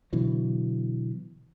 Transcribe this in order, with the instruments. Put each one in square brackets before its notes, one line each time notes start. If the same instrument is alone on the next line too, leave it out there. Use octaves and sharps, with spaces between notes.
[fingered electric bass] B2 D3 E3 F#3